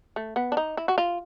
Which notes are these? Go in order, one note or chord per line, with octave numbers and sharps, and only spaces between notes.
A3
B3
D4
D#4
E4
F#4
F4